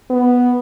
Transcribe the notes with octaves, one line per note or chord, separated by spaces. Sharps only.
B3